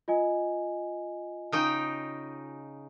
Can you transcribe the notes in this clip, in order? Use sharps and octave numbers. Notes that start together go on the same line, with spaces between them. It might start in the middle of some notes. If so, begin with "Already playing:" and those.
F4 D#5 G#5
C#3 D#4 G5